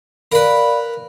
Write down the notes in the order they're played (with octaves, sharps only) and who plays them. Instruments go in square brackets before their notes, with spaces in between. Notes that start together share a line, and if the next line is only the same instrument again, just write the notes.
[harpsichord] A#4 B4 [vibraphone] D5 F5 B5